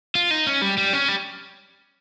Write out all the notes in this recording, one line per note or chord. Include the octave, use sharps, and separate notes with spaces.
F4
D#4
C#4
G3
G3
C#4
G3